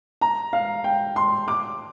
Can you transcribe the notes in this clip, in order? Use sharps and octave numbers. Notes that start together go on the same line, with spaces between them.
A#5
F5
G5
C6
D6